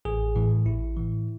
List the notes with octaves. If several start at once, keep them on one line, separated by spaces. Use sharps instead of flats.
A1 G#4
A2 E3
A1 E4
A2 E3